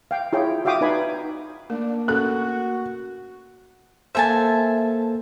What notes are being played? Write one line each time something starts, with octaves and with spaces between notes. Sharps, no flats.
F5 G5
E4 F4 G#4 C#5 G5
F#4 E5 F5 G5 D6 D#6
D#4 B4 D5 G#5 B5
A3 A#3 D4 A#4
C#4 F#4 A4 F#6
A#3 A4 C5 E5 G#5 A5